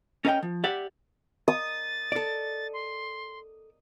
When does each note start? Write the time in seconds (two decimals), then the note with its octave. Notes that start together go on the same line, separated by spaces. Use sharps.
0.25 C#4 A#4 D#5 E5 G5
0.43 F3
0.64 G4 D5 E5 F#5
1.48 D#6 A6
2.12 A4 D5
2.73 C6